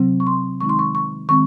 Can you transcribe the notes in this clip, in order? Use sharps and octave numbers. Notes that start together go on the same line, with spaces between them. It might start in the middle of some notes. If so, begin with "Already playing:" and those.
Already playing: C3 F#3 C4
C#6
C6
D#3 G#3 C4 D#4 C#6
C6
C#6
C#6
D#3 G#3 C4 C#6